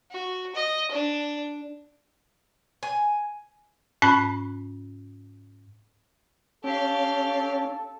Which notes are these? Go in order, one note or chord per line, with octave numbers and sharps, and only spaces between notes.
F#4
D#5
D4
G#5
G#2 C#4 B5 C#6 F#6
C#4 G4 A4 F5